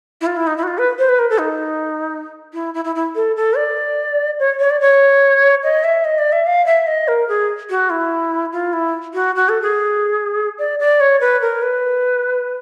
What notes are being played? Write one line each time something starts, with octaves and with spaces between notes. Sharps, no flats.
E4
F4
E4
D#4
E4
F#4
F4
B4
C5
B4
A#4
A4
D#4
E4
E4
E4
E4
A4
A4
D5
C#5
C#5
D5
C#5
D#5
E5
D#5
D5
E5
F5
E5
D#5
A#4
G#4
F#4
E4
F4
E4
F#4
F#4
A4
G#4
D5
D5
C#5
B4
A#4
B4